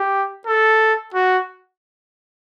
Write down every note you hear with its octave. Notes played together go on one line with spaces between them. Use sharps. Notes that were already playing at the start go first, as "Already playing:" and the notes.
Already playing: G4
A4
F#4